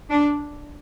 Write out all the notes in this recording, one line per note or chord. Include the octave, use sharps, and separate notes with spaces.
D4